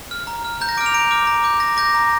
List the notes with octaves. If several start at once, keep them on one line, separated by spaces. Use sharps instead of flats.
F6
A#5
F6
A#5 G6
A#6
D6 F6 D7
F7
A#5 D7
D6 F6
A#5
D6 G6
A#5 A#6
D6 G6 A#6
A#5